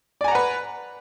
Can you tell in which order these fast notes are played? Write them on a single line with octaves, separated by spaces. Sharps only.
D5 G#5 A#5 F#5 B4